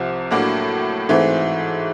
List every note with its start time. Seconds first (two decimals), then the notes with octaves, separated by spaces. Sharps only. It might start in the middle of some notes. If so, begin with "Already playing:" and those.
Already playing: C2 C3 F3
0.31 A2 F#3 A#3 D4 F#4
1.09 G#2 E3 A3 C4